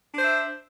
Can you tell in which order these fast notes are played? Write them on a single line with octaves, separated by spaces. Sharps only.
D4 C5 E5